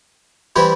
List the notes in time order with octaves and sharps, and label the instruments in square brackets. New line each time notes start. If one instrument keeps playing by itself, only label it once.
[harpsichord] E3 G3 C4 E4 G4